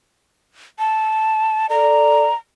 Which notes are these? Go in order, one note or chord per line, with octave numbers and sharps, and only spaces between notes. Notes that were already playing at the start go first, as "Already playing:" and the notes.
A5
A4 D5 A#5